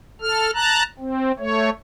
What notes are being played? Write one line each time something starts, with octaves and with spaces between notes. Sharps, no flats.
A4 F6
A5 A#5 F#6
C4
A3 C#5